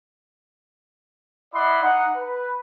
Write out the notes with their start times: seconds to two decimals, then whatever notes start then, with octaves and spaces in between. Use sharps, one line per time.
1.54 E4 D5 D#5 F#5 B5 C6
1.83 D#4 F#5
2.17 B4